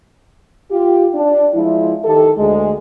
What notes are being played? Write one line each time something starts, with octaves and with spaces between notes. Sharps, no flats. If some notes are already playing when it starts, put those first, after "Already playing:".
F4 G4
D4
F3 G#3 E4
D#3 G4 A4
D2 G#3